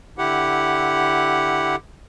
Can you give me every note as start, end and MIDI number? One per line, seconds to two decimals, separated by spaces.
0.18 1.76 50
0.18 1.76 64
0.18 1.76 67
0.18 1.76 78